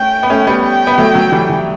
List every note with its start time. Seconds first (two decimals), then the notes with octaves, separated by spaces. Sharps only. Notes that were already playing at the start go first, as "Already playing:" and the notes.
Already playing: A3 C#4 G5
0.23 B3
0.30 A3 C#4
0.47 G3 B3
0.63 G5
0.87 B3
0.98 F#3 A3
1.15 F#3
1.32 E3 G3
1.49 E3